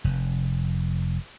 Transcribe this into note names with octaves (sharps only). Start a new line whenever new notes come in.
F1